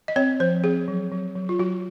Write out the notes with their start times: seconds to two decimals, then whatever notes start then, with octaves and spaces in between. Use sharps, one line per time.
0.08 D#5
0.16 C4 C#5
0.40 F3 C5
0.64 C4 G#4
0.88 F#3
1.12 F#3
1.35 F#3
1.49 F4
1.59 F#3 F#4